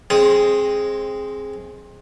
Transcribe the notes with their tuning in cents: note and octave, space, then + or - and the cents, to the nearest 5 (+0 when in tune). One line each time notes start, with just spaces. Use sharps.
G#3 +0 C4 +20 D#6 +0